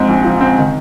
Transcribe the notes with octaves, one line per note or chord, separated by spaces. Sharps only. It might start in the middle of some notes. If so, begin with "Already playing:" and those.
Already playing: G#2 F3 C4
A#1
F3
C4
D#3